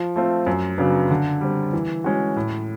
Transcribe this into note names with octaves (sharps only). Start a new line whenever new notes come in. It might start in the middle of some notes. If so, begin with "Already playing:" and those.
Already playing: F3
A3 C4 F4
F#2
C#3 F#3 B3 D4
D3
G3 C4
E3
G#3 C#4 F#4
A2